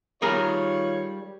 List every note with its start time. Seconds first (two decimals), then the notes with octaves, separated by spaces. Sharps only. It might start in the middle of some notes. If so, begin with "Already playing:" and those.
0.22 D#3 G3 F4 G#4 A#4 C#5